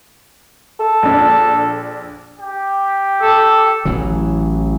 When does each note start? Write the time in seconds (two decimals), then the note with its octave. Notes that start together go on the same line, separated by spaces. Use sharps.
0.79 A4
1.03 A#1 D4
2.39 G4
3.22 A4
3.85 A1 E3 F#3